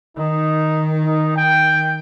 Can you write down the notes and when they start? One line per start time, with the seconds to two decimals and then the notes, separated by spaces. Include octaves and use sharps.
0.17 D#3 D#4
1.05 D#4
1.36 G5